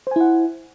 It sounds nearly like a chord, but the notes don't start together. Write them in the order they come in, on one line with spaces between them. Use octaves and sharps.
C5 G#5 E4 F#5